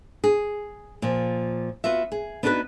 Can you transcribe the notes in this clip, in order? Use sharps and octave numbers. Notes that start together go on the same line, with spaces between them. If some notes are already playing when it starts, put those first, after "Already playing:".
G#4
A#2 F3
B3 F4 F#4 E5
G#4
B3 D4 D#4 F#4 A4 B4